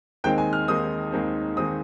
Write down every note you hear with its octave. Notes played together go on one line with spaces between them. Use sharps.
D#2 D#3 G#3 C4 G5
G#5
F6
D#2 D#3 G#3 C4 D#6
D#2 D#3 G#3 C4
D#3 G#3 C4 D#6